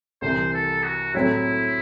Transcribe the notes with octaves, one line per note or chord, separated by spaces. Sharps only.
C2 C3 E3 C5
A4
F#4
A2 F#3 A3 C4 E4